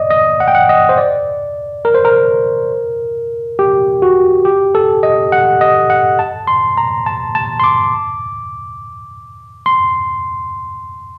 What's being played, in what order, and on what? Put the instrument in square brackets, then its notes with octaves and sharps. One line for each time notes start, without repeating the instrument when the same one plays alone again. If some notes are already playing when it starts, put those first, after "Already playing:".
Already playing: [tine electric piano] D5 D#5
D#5
F#5
G5
F#5
D#5
C5
D5
A#4
C5
A#4
G4
F#4
G4
A4
D#5
F#5
D#5
F#5
A5
C6
A#5
A5
A5
C6
D6
C6